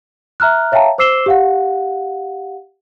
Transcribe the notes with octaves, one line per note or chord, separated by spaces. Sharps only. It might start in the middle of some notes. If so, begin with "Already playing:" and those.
E5 A#5 F6 F#6
C#5 E5 F5 G5 A5 A#5
C5 D6 E6 C7 E7 G7
G4 F5 F#5